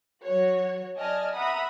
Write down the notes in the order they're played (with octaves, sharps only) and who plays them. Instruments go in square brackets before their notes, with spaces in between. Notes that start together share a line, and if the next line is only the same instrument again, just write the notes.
[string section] F#3 F#4 C#5
D5 D#5 G#5 A5 F6
E5 F#5 A#5 B5 D#6